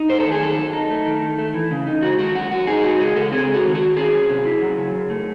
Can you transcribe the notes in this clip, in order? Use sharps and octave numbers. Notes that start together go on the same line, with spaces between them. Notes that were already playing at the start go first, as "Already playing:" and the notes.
Already playing: D#4
A3 C5
A4
D#3
G#4
F#2 A4
F#2
D#4
A3
D#3
D#3
A3
E3
C#3
D#4
G#3 F#4
D#3 F#4
F#2 F#4
F#2 F#4
D#4 G#4
G#3 F#4
C#3 G#4
C#3 A4
C4 G#4
G#3
F#4
D#3
F#4
D#3
C#4 G#4
F#3
C3
E4
F#3
C#3
F#2
A3